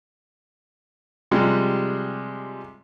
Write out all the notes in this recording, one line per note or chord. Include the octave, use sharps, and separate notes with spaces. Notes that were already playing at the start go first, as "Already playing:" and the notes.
C3 F3 G3 G#3